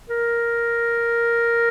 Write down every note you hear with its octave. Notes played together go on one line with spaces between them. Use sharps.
A#4